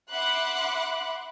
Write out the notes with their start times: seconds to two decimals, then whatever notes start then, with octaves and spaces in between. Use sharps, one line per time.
0.11 E5 F#5 B5 C6 D6 F#6